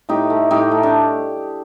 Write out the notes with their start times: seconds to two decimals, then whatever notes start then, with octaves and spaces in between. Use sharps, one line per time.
0.09 A2 D#4 G4
0.30 A3
0.51 A2 D#4 G4
0.72 A3
0.83 D4